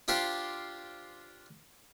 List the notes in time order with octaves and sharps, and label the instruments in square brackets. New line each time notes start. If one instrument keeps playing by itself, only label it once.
[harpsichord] D4 F4 G4 C5 F5